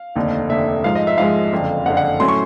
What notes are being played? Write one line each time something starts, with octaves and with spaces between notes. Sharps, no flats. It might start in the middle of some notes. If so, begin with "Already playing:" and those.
Already playing: F5
F1 D#2 D3
F1 D#2 D3 E5
G#2 F3 G#3 F5
D#5
E5
G#2 F3 G#3 F5
F#1 F2 D3
F#1 F2 D3 F#5
F#5
A2 F#3 A3 C#4 C6
C#6